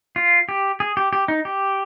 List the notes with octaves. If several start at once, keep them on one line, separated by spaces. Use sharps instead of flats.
F4
G4
G#4
G4
G4
D#4
G4